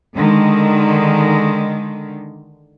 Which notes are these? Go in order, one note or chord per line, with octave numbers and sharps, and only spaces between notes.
D3 D#3 G#3